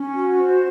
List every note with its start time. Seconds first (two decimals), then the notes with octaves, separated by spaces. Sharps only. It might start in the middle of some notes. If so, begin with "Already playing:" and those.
Already playing: C#4
0.13 F#4
0.38 C5